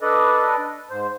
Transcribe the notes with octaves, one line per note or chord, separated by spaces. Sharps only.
D4 A4 B4 D5 D#5
G#2 C5